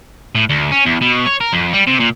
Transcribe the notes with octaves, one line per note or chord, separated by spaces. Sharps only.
A2
D2
C#4
E2
B2
C#5
A#4
F2
G3
C3
A#2